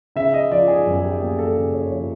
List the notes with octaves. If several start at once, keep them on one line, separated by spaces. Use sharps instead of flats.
C#3 E5
D#5
F3 D5
G#4
F#2
G#4
G4
A#3 G#4
A4
C#3 G#4
C#5
F3 C#5